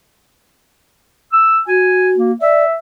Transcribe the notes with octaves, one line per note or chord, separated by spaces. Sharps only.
E6
F#4 G#5
A#3
D5 E5